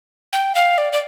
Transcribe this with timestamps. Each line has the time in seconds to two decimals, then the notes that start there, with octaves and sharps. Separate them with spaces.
0.33 G5
0.55 F5
0.78 D5
0.93 D5